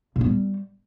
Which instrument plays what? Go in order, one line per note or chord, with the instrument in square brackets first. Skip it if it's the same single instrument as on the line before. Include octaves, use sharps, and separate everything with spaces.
[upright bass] A#2
B3
G3